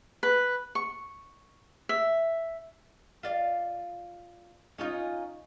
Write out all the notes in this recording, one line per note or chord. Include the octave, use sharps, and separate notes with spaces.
B4
C#6
E5
F4 D5 F5
C#4 D#4 F4